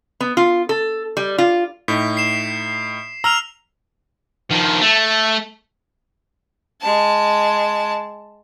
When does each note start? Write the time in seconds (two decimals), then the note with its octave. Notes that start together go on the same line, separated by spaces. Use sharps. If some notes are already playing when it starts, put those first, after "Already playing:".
0.21 B3
0.37 F4
0.69 A4
1.17 G3
1.38 F4
1.88 A2 D#4 B6
2.17 C7 E7
3.24 A#5 E6 F6 F7
4.51 D#3 F3
4.81 A3
6.81 G#3 A5